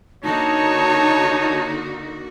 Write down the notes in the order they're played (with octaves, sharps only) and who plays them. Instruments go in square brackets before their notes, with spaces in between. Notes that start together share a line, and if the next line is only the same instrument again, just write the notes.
[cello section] D3 A#3 F#4 [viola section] D#4 [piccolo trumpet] C#5 [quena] A5